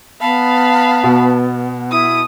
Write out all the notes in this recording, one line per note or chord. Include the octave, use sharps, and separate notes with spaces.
B3 F5 A5 B5
B2
E4 D#6